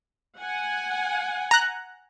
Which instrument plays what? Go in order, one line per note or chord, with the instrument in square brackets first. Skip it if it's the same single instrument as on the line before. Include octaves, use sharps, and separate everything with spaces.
[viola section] F#5 G#5
[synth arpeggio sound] A#5 F#6